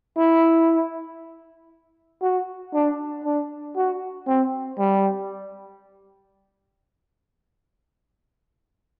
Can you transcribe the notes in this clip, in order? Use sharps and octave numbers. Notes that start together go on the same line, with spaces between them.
E4
F#4
D4
D4
F#4
C4
G3